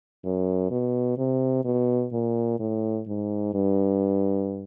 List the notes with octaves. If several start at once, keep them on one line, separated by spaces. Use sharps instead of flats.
F#2
B2
C3
B2
A#2
A2
G#2
G2